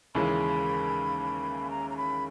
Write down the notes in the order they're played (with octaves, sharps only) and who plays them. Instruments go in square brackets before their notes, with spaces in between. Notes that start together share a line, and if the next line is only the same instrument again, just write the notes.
[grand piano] D#2 C#3 E3 G#3 [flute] B5
[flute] A#5
A#5
B5